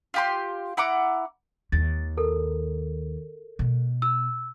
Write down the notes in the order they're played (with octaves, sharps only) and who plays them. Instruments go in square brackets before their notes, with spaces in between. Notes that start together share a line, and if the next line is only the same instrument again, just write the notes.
[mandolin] F4 G4 C6
E4 F#5 A#5 D6
[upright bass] D#2 [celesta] A6
[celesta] A4 A#4
[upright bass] B2
[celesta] E6